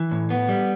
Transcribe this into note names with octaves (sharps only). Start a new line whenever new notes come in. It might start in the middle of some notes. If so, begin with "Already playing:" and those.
Already playing: E3
A2
B3
G3